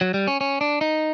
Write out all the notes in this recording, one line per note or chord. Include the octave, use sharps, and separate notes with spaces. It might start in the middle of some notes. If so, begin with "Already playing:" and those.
F#3
G3
C#4
C#4
D4
D#4